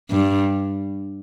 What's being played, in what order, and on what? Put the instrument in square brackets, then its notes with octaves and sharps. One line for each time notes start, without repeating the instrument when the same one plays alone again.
[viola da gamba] G2